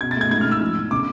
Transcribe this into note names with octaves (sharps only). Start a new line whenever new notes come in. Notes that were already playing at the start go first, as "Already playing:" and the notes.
B2 G#6
A6
A3 G#6
G#2 G#6
F6
G#2 E6
F3
E2
D3 D6